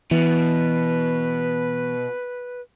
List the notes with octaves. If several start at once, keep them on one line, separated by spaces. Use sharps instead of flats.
B2 E3 B4